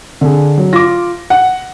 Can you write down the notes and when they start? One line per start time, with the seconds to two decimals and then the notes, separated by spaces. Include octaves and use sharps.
0.21 D3 G#4
0.57 F#3
0.73 F4 D6 A#6
1.30 F#5